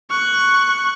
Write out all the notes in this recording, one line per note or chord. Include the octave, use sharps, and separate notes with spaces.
C#6 F#6